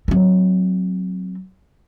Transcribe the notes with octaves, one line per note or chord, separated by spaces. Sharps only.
F#3 C4